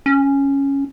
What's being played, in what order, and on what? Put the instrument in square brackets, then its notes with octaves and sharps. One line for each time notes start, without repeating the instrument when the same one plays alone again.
[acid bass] C#4